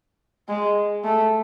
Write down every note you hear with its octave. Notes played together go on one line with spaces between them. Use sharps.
G#3
A3